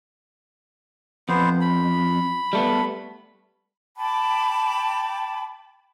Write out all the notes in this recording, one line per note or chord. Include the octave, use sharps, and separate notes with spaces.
F2 B3 C5
B5
G3 A3 B3
G5 A5 B5 D6